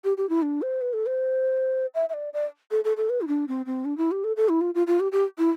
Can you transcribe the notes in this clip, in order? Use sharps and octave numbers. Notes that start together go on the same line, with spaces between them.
G4
G4
E4
D4
C5
B4
A4
C5
E5
E5
D5
D5
A4
A4
A4
B4
E4
D4
C4
C4
D4
E4
G4
A4
A4
E4
F4
F4
F4
G4
G4
E4